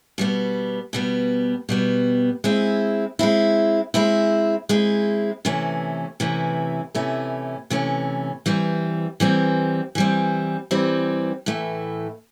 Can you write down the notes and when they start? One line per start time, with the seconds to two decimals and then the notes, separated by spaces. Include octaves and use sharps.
0.18 B2 G3 B3
0.93 B2 G3 B3
1.69 B2 G3 B3
2.44 G#3 C4 E4
3.19 G#3 C4 E4
3.94 G#3 C4 E4
4.69 G#3 C4 E4
5.45 C3 E3 A3 C#4
6.20 C3 E3 A3 C#4
6.95 C3 E3 A3 C#4
7.70 C3 E3 A3 C#4
8.46 E3 G3 C4
9.20 E3 G3 C4
9.95 E3 G3 C4
10.71 E3 G3 C4
11.46 A2 E3 A3